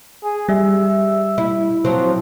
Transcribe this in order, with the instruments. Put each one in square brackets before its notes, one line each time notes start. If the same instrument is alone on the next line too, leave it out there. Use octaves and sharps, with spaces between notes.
[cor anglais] G#4
[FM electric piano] G3 [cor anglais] E5
[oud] E4
[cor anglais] F3 [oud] F#3 C4